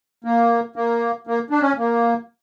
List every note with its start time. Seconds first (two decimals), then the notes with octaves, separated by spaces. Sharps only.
0.24 A#3
0.76 A#3
1.27 A#3
1.50 D4
1.61 C#4
1.78 A#3